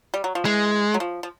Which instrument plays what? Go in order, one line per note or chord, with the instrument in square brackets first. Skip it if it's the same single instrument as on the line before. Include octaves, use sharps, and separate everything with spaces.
[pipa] G3
F#3
F3
[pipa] E3 [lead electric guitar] G#3
[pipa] F#3
F3
F3